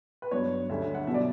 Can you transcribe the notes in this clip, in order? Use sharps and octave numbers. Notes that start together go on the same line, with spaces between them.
B4
G2 F#3 B3 D4 C#5
D2 D3 G3 C#4 E5
E5
F#5
B2 F#3 E5
D5